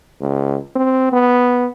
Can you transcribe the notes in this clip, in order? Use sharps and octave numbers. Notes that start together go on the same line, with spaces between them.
C#2
C4
B3